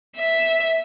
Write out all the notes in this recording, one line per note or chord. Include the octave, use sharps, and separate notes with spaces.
E5